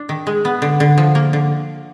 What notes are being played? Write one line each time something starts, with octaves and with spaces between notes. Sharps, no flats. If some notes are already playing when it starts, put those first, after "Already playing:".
Already playing: D4
D#3
G#3
B3
D3
D3
F3
A#3
D3